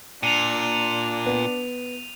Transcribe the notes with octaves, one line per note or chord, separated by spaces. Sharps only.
A#2 D4 D#7 F7
B3